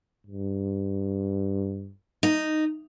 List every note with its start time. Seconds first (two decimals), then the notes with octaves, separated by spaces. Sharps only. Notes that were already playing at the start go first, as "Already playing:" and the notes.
0.27 G2
2.23 D#4